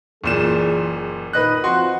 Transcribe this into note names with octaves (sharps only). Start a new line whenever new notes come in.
F#1 A#2 E3 G#4 E7
A#2 D#3 B4 D#5 F#6
F2 F3 F#4 F#5 C6